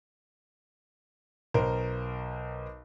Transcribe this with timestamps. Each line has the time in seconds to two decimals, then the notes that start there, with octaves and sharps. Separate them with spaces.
1.54 B1 A#4 C5